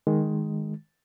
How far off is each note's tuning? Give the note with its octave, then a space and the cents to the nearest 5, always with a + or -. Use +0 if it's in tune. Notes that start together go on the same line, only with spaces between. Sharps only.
D#3 +0 G#3 +5